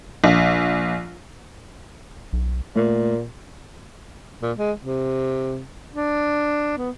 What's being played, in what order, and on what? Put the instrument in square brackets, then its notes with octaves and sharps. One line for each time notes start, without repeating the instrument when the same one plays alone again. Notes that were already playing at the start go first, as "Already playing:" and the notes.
[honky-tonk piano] A#1
[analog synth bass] B1
[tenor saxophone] A#2 [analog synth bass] A3
[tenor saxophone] A#2
G#3
C3
D4
B3